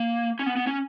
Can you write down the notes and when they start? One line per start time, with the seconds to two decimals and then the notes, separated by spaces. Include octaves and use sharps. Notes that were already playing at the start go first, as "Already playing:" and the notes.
Already playing: A#3
0.39 C#4
0.46 B3
0.57 B3
0.67 C#4